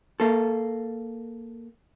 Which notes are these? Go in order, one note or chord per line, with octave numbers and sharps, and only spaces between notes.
A#3 A4